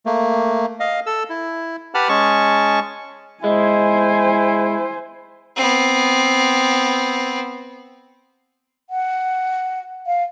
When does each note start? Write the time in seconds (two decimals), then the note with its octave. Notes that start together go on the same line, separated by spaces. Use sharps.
0.06 A3 A#3
0.80 D#5 F5
1.06 A4 E6
1.30 E4
1.94 G4 B4 F#5 A5 B5 F6
2.09 G#3 C#4 G#4 A5 C#6
3.44 G#3 E4 C5 G#5
5.56 B3 C4
8.90 F#5
10.07 F5